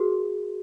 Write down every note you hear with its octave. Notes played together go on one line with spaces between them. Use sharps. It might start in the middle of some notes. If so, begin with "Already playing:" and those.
Already playing: F#4 G#4 A#4